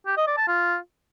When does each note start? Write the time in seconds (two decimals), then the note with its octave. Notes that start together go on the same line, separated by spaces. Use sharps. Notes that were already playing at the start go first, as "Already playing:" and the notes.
0.07 G4
0.17 D#5
0.27 D5
0.37 A5
0.48 F4